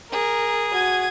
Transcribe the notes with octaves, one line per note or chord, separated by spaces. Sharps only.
G#4 A#4
F#4 G#6 D#7